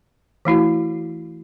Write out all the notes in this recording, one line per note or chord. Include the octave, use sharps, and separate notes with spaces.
E3 A3 E4 F#4